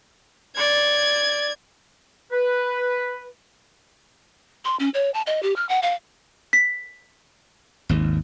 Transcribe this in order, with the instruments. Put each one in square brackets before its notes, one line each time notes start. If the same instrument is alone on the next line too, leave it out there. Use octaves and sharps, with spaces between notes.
[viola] D5 [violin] G#6
[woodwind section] B4
[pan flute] C6
C#4
C#5
A5
D#5
G4
F6
F#5
F5
[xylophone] B6
[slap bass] G#1 D#2